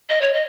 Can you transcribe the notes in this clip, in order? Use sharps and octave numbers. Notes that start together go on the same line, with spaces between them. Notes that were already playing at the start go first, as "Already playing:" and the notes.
D#5
C#5
D#5